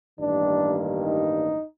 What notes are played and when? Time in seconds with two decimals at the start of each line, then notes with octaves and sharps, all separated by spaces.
0.20 A1 G2 D#3 G3 A#3 D4
1.04 D#4